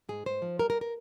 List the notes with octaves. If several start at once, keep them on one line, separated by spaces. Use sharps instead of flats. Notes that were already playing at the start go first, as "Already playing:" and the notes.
G#2 G#4
G#2 C5
F3
G3 A#4
A#4
A#4